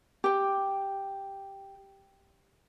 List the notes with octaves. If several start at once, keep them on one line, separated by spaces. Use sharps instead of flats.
G4 G5